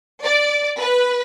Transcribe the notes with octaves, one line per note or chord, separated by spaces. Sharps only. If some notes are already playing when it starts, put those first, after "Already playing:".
D5
B4